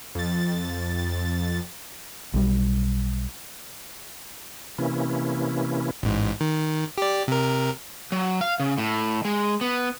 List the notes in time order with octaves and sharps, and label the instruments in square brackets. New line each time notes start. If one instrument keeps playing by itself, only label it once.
[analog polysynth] F2 A6
[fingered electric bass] B1 G3
[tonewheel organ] C3 E3 A#3 C#4 E4
[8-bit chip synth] A1 G#2
D#3
G4 D5
C3 A#4
[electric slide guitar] F#3
F5
C#3
A2
G#3
B3